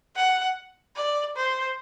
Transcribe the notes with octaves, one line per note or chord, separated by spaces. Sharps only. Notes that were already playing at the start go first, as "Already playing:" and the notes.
F#5
D5
C5